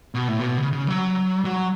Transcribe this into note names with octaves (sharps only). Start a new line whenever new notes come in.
B2
A2
B2
C#3
C#3
F#3
F#3